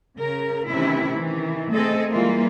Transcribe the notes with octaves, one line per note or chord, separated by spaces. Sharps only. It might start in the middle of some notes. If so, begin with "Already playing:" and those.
C#3 A#4
C3 D#3 E3 A3 C#4 E4
D#3 E3
A3 C4 G#4 A4 D#5
E3 G3 G#3 A#3 F4